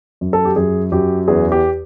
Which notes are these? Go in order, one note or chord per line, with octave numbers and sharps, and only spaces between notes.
F#2
A4
G4
F#2 G#4
F#2 G4
E2 G#4
G4